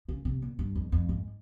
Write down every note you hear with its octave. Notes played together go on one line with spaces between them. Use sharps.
C#3
C3
A#2
G2
F2
F2
G#2